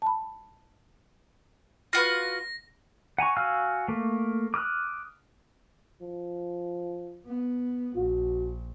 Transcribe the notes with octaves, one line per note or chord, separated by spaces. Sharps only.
A5 B5
F4 F#4 B4 A#6
F#5 G#5 A#5 C#6
F#4 F5 G#5 E6 F6
A3 A#3
D6 D#6 F6 F#6
F3
B3
A#1 F#4